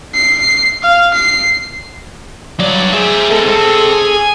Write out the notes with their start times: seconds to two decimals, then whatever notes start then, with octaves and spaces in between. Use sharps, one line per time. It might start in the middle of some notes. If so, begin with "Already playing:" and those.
0.15 C7
0.83 F5
1.14 C7
2.59 G2 F#3 D5
2.93 G4 G#4 C5 E5
3.30 B2 G#3 A4
3.46 C3 C4
3.93 G#5